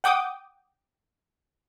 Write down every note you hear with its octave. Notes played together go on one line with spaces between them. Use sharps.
F#5 G5 D6 D#6